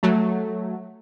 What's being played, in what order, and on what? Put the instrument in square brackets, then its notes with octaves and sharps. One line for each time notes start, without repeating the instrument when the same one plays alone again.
[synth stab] F#3 A3